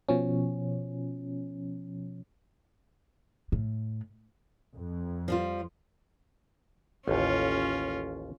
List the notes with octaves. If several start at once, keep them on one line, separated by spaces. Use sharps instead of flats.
B2 F3 C#4
A2
F2
F3 G3 F4
A1 D#2 C#4 F4